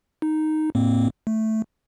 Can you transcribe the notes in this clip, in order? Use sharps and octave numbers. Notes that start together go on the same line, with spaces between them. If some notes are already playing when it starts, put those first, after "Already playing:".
D#4
A2 A#3 C4
A3